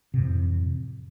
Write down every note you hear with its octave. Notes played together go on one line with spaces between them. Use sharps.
F2 A2 C3 E3